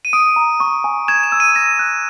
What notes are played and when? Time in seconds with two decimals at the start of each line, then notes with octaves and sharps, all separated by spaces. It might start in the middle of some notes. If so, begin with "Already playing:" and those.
0.05 D#7
0.13 D#6 D7
0.36 A#5
0.60 C#6
0.84 G#5
1.08 G#6 E7
1.23 E7
1.32 E6
1.40 D#7
1.55 A#6 E7
1.79 F#6